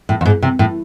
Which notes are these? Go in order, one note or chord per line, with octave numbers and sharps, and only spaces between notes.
A2
F2
G#2
C3
A2